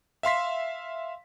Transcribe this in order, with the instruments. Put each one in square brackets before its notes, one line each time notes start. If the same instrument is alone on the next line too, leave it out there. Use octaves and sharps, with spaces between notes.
[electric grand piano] E5 F5 C6 B6